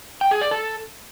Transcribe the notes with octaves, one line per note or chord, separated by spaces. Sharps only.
G5
G#4
D5
A4